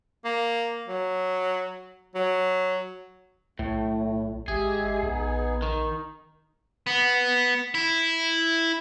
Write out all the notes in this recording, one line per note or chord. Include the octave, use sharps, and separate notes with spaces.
A#3
F#3
F#3
B1 A2 A3
G#1 G#3 G4 G#4 E5
A#1 B3 D#4
D#3 D#4
B3
E4